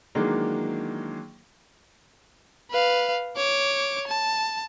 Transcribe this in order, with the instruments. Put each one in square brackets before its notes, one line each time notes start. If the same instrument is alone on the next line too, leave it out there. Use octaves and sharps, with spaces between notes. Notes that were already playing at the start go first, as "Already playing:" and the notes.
[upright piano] D#3 E3 F#3 G#3 A#3 D4
[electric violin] B4 F5
C#5 D6
A5